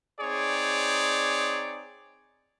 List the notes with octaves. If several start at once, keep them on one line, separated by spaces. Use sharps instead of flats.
C4 D#4 G#4 C#5 D5